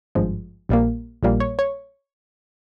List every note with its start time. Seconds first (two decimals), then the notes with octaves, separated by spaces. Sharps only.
0.15 G#1 G2 F3 G#3
0.69 A#1 A#2 G3 A#3
1.23 A#1 A#2 G3 A#3
1.40 C#5
1.59 C#5